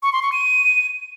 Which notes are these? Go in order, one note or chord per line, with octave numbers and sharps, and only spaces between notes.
C#6
C6
C#6
D#7